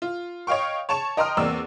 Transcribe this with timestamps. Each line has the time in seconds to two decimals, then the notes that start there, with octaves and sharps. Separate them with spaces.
0.02 F4
0.47 C#5 D#5 F5 G5 C#6
0.89 C#5 A5 C#6 E7
1.17 D#5 G5 A#5 C6 D#6 F6
1.37 E2 A#3 C4 D5 E6